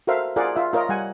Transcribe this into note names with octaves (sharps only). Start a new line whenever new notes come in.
F#4 A4 A#4 C5 E5 F5
F4 G#4 A#4 D5 F5 F#5
F4 E5
F4 A#4 C#5 D#5
G3 F#5 G#5